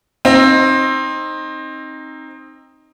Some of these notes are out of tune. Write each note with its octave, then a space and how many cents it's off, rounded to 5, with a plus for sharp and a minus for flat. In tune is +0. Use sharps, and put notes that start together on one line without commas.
C4 +20 D#4 +0